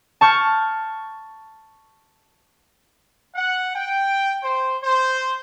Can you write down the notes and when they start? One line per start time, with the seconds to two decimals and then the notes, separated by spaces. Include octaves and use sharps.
0.21 A5 C#6 F6 G6
3.35 F#5
3.76 G5
4.43 C5
4.84 C5